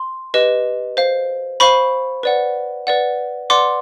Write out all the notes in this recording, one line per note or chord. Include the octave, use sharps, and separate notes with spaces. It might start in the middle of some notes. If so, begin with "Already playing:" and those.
Already playing: C6
G4 B4 D#5
C5 F5
C5 F5 B5 C#6
B4 D5 F#5
B4 D5 F#5
B4 D5 F#5 C6 D6